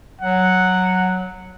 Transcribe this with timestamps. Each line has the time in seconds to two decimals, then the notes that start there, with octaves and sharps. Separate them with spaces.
0.21 F#3 F#5